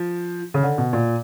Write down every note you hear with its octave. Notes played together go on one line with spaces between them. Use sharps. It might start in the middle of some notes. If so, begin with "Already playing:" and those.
Already playing: F3
C#3
D3
B2
A#2